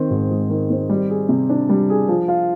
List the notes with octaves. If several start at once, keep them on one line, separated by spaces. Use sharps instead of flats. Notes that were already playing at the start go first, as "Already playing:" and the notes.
Already playing: D#3 C4
G#2
G#3
D#3
C4
G3
G#4
C3
D4
G3
G#4
F3
F4